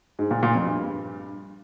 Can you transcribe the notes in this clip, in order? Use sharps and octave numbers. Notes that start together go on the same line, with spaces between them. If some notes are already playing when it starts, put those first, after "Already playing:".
G#2
A#2
A#2
F2
G2